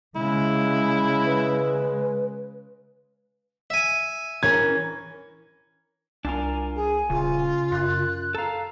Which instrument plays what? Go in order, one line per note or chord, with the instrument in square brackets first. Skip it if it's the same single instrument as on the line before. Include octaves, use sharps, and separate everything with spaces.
[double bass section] C#3 G#3 [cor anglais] E4
[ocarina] B4
[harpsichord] E5 G#5
[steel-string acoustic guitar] E3 C#4 A#4 [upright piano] G#6
[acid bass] C2 [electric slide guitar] D4 F4 A#4 [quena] G#5
[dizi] G#4 [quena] G#5
[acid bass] D#1 [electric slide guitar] C#3 [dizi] F4
[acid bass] F#2 [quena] F#6
[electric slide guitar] A4 F5 [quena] A#5